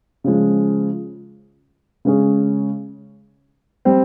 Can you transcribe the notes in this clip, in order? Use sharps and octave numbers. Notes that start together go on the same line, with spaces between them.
C#3 F3 G#3
C#3 G#3 C#4 G#4
G3 C4